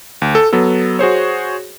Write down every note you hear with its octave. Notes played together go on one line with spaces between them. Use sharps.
D2
A4
F#3 B3 A4
F#4 G#4 C5 C#5